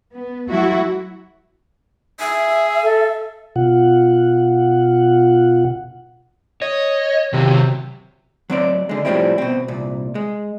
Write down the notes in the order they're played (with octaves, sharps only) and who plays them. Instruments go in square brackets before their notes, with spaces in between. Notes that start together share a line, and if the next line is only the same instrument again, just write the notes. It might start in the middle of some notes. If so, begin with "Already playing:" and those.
[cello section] B3
F#3 A3 E4 F#4
[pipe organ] G#4 [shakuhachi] E5
[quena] A4
[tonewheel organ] B2 F4 F#5
[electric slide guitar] C#5 [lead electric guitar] D#5
[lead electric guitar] C3 [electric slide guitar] D#3 F#3
[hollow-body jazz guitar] F#3 C4 D5
D3 G#3
A2 C#3 F3 G3 C4 E4
B2 C4
C2 A#2
G#3